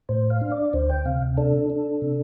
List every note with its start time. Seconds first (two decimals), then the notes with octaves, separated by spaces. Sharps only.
0.09 A2 C5
0.30 F5
0.41 D4
0.52 D5
0.73 D2 C5
0.89 G5
1.05 C3 F5
1.37 D4 A4
1.70 D4
2.02 C3